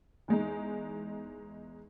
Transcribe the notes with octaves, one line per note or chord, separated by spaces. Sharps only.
E2 G#3 D#4